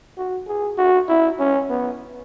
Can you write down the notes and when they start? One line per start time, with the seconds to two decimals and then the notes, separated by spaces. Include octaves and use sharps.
0.18 F#4
0.48 G#4
0.78 F#4
1.09 E4
1.39 C#4
1.70 B3